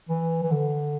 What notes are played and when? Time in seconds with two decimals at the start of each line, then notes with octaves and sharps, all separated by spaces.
0.09 E3
0.43 E3
0.51 D3